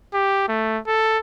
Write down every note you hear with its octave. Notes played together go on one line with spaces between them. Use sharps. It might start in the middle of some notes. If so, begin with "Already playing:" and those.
G4
A3
A4